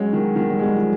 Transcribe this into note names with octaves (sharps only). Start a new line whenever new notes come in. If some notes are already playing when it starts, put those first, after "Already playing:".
Already playing: F#3 G#3 C#4
D#3
D#3
G3
F#3 G#3
F3